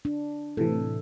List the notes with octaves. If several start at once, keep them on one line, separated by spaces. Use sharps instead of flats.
D4
A2 C3 E3 A4